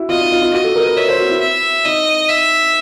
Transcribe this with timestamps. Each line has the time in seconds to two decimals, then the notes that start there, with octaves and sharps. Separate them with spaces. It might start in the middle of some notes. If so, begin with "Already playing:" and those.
Already playing: E4 F#4
0.09 F4 D#5
0.21 D#4
0.32 F4
0.42 F4
0.53 F#4 D#5
0.64 A4
0.76 A#4
0.86 B4
0.97 C#5 E5
1.09 C5
1.19 F#4
1.29 E4
1.41 E5
1.85 D#4 D#5
2.29 E5